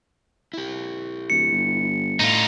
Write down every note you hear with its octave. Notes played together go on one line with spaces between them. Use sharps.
E4 G4
D1 C#7
G1
A2 D#4 F4